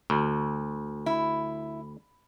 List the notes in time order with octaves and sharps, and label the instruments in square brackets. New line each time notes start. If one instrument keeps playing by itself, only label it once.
[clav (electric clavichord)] D2
[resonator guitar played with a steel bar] E4